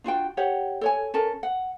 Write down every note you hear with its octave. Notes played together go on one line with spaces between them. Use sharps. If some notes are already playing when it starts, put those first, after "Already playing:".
D4 F4 F#4 G5
G4 C#5 F#5
A4 C#5 G#5
C#4 A4 A#4 A5
F#5